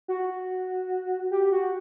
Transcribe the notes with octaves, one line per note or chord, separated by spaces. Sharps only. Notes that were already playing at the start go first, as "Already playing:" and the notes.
F#4
G4
F#4